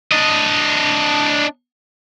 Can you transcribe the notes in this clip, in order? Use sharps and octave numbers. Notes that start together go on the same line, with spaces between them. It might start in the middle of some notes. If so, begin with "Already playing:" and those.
D4 D#5